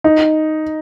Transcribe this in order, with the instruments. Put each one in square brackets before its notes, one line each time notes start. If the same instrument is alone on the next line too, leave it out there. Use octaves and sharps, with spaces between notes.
[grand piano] D#4